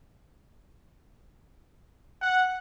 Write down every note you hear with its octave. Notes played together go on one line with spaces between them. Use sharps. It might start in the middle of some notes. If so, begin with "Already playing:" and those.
F#5